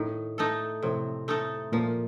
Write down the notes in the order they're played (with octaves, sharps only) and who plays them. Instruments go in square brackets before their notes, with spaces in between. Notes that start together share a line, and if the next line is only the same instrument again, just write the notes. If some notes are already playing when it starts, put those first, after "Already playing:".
Already playing: [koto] A2 [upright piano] D#3 D#4
[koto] A3 D#4 A4
[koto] A2 [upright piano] C3 C4
[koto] A3 D#4 A4
[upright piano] A#2 A#3 [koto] F3